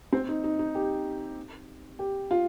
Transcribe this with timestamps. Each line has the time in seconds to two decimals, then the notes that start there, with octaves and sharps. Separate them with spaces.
0.13 C4
0.28 D#4
0.44 D#4
0.59 D#4
0.75 G4
1.99 G4
2.31 F4